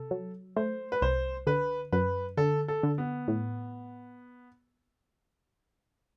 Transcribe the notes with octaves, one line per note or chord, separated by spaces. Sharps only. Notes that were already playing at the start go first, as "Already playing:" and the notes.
Already playing: C3 A4
F#3
A3 C5
B4
C2 C5
D3 B4
F#2 B4
D3 A4
A4
D3
B3
A2